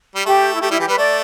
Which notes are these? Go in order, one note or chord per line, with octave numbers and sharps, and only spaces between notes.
G3
A3 G4
E4
A3 G4
G3 E4
E3 G4
G3 B4
A3 D5